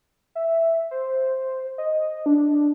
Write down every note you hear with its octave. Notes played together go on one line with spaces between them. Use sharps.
E5
C5
D#5
D4